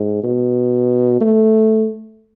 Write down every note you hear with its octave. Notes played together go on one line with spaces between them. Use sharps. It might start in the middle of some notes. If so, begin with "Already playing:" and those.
Already playing: G#2
B2
A3